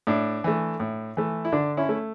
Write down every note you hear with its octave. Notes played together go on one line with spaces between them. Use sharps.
A2 D4
E3 A3
A2
E3 A3
E4
D3 D4
C#4 E4
A3